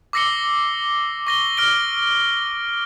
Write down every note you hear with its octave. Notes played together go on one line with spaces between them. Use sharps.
D6 E6 A#6 C7 C#7 G7
C#6 A#6 G7
F6 A#6 D7 G7